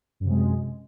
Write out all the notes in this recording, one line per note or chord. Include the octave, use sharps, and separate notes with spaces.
F#2 C3 G#3